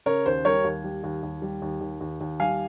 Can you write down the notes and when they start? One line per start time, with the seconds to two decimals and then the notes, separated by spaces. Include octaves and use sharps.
0.06 C#3 A#4 C#5
0.26 D#2 C5
0.45 G3 A#4 C#5
0.64 D#2
0.84 G3
1.04 D#2
1.23 D#2
1.42 G3
1.62 D#2
1.81 D#2
2.01 D#2
2.21 D#2
2.40 G3 F5 G#5